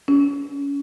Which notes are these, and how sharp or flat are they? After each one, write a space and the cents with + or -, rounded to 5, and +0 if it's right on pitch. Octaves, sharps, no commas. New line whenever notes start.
C#4 +25